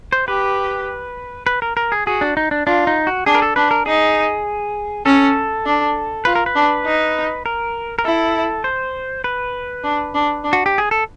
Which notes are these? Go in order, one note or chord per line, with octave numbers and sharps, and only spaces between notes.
C5
G4 B4
B4
A#4
A#4
G#4
F#4 G#4
D4
D#4
D4
D4 F4
D#4
F#4
D4 G#4
A#4
A4
D4 B4
A#4
D#4 G#4
C#4 A4
D4
F4 B4
A#4
B4
D4
D#4
A#4
A#4
E4 A4
C5
B4
D4
D4
D4
F#4
G4
G#4
A4